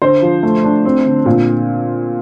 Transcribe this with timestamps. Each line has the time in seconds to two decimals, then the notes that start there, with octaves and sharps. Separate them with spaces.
0.02 D3 C5
0.22 F3
0.43 A3
0.64 D4
0.85 C4
1.06 D3
1.26 A#2